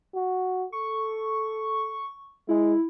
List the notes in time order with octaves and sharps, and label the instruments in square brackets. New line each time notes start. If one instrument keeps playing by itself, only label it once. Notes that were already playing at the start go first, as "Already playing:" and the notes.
[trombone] F#4
[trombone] A4 [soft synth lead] C#6
[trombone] G#3 [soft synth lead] E4